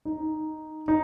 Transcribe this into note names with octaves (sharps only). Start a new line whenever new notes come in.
D#4
D#4